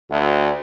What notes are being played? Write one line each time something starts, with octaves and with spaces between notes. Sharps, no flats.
D2